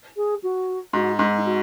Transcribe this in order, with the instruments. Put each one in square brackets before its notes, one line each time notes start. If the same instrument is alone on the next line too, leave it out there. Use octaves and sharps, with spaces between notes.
[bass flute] G#4
F#4
[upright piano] G#2 [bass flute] F#4
[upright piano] G#2 [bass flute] D#4
[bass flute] F#4